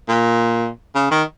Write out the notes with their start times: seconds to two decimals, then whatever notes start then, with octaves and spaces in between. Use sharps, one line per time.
0.09 A#2
0.95 C#3
1.11 D#3